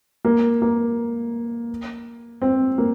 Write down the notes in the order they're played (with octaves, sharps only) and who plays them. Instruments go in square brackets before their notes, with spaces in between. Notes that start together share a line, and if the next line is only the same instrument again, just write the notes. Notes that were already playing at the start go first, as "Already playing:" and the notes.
[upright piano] A#3
A#3
C4
A#3